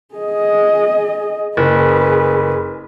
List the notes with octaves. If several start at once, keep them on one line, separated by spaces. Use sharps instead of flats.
G#4 D#5
F#1 G#4 B4